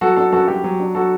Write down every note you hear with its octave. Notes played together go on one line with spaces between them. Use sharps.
F#3 F#4 A4
D4 F#4 A4
F#2 F#4 A4
F#3 G4
F#3
D4
F#3 F#4 A4